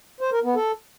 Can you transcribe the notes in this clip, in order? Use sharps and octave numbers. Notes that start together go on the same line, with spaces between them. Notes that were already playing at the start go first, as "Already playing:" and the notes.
C5
A#4
B3
A4